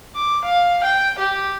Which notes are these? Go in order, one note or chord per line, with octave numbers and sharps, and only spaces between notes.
D6
F5
G5
G4